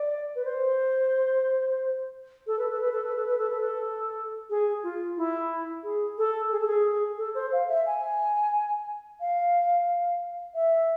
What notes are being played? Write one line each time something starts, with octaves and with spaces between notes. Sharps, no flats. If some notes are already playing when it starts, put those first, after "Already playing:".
Already playing: D5
B4
C5
A4
B4
A4
B4
A4
B4
A4
B4
A4
B4
A4
G#4
F4
E4
G#4
A4
G#4
A4
G#4
A4
C5
F5
E5
G#5
F5
E5